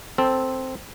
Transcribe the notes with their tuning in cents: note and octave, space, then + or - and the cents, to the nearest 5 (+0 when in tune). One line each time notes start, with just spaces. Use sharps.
C4 +0 A4 +0